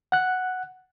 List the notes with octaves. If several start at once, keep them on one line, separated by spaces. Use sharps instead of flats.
F#5 F#6